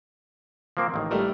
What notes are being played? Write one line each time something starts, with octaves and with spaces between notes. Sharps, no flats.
F3 A#3 C4
A1 D#3
G3 A3 A#4